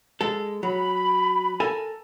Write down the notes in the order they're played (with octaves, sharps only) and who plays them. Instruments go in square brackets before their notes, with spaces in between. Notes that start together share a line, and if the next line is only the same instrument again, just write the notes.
[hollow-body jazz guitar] G#3 A4
[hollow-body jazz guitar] F#3 [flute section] B5
[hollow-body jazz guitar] A4 A#4 G#5